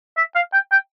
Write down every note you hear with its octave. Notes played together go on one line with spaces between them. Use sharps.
E5
F5
G5
G5